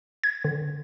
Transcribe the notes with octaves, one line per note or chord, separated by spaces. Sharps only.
G#6
D3